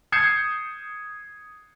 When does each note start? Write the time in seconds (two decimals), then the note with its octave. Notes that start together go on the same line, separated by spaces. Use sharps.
0.12 D#6 G6 G#6 C7 C#7 E7